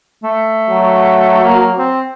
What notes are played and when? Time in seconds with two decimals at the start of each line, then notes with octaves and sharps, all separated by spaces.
0.23 A3
0.70 F#3
1.44 A#3
1.78 C4